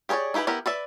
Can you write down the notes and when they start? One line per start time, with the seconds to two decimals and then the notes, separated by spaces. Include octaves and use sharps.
0.09 G4 G#4 A#4 C#5 D5
0.34 D#4 E4 G4 G#4 B4
0.47 B3 E4 G4 A#4
0.66 B4 D5 E5